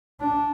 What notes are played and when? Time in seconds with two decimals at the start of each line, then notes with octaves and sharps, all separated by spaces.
0.21 D4